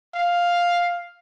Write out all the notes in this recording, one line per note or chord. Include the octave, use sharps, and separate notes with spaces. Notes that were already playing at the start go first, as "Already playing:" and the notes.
F5